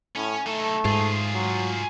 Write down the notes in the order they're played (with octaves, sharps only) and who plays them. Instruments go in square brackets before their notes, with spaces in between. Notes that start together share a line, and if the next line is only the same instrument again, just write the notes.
[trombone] A2 [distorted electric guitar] C#4
[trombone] A3 [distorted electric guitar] D#4 A4
[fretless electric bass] G#2 [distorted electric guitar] F4 G#4
[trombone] F#3